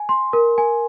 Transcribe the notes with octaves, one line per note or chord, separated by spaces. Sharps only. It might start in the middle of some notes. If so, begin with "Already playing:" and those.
Already playing: G#5
C6
A#4
G#5